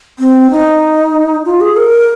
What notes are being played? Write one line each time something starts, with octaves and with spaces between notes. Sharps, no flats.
C4
D#4
F4
G#4
A#4